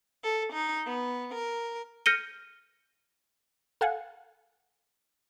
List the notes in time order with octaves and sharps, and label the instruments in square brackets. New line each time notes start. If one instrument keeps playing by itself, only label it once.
[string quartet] A4
D#4
B3
A#4
[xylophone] F6 G6 A#6 C#7 D#7 G7
[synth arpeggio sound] A4 F5 F#5 G#5